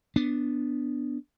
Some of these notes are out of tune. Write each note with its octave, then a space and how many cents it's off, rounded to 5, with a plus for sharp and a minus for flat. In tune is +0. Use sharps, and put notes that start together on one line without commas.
B3 +0 D4 +0